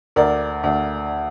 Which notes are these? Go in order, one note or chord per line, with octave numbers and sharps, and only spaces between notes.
D2 A#4 D5
D2